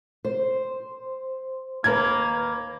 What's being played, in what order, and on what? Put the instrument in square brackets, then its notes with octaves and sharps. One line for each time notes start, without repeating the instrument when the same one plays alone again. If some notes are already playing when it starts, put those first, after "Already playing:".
[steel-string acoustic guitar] C5
[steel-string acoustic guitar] D#2 B4 [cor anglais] A#3 [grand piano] A#5 G#6